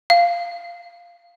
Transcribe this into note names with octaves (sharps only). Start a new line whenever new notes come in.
F5